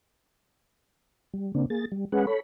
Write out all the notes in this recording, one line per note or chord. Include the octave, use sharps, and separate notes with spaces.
G3
C#3 A#3 C4 D4
A#3 G#4 A6
G3
G#3 C#4 G#4 B4 F#5
A4 C#5 B5